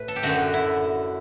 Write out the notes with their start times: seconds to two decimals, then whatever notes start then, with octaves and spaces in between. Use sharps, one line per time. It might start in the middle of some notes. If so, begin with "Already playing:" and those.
Already playing: A2 B4
0.08 A4
0.16 G4
0.23 F#2 D3 A3 F#4
0.54 E4